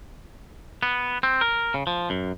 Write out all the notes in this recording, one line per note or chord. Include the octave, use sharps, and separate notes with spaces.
B3
C4
A#4
C#3
F3
F#2